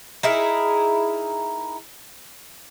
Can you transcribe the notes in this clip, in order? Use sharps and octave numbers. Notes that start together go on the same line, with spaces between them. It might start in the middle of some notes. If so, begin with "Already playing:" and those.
D#4 E4 G#4 A#4